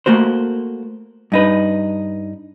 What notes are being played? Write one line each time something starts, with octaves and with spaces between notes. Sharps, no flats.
A3 A#3 F#4 C5
G2 D#4 B4